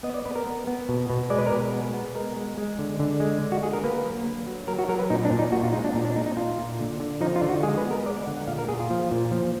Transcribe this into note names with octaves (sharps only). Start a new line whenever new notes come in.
B3 D#5
D5
B3 B4
A#4
B3
B3
B2
B2
G#3 D5
B4
A#4
B2 B4
B3
B3
G#3 A#4
G#3
G#3
D3
D3
G#3
D3
F#4
A#3 G#4
A#4
A#3 B4
F#3
D3
F#3
F#3 A#4
F#4
F#3 A#4
B4
A#2 D#4
D4
A#2
D#4
A#2 F#4
F4
G#3 D#4
D4
A#2 D#4
D4
G#3 D#4
D#4
A#2 F4
A#2
D3
D3
F3 D#4
F4
D3
F#4
G#3 G#4
B4
B3
A#4
G#3 D5
D3 F#5
F#5
A#2 F5
A#4
A#2 G#4
F4
F3
A#2
F3